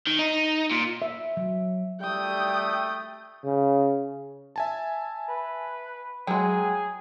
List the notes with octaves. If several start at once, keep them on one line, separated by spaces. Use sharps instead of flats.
D#3
D#4
A#2
E5
F#3
G3 A3 G5 D#6
C#3
E5 G#5 A5
B4
F#3 G#3 G#4 G5